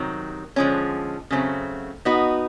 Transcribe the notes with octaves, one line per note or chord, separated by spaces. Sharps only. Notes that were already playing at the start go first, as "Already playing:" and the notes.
Already playing: C3 D#3 F#3
D3 F3 G#3 C#4
C#3 F#3 A3 C4
B3 D#4 F#4 B4